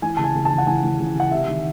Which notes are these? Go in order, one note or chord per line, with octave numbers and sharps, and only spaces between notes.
E3 G#5
C#3 A5
G#5
C#3
A5
E3
F#5
E3 G#5
E3
C#3
C#3 F#5
C3 E5
D#3